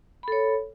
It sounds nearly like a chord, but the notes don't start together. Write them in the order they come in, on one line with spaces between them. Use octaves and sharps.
B5 A4 C#5